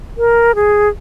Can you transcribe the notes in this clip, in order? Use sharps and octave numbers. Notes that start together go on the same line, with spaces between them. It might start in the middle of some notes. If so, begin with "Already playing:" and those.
A#4
G#4